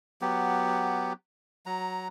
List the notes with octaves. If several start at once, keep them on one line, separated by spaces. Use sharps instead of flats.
F#3 B3 G4
F#3 A#5